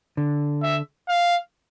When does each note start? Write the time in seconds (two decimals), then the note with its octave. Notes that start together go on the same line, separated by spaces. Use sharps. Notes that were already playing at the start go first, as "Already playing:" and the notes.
0.17 D3
0.63 E5
1.08 F5